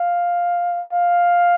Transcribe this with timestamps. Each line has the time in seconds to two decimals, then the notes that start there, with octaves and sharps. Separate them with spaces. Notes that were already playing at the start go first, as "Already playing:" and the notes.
Already playing: F5
0.93 F5